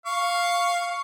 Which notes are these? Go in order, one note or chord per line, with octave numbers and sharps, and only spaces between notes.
F5 C#6